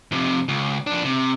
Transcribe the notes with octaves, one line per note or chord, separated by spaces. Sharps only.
F2 C3
C#2
F2 D4
C3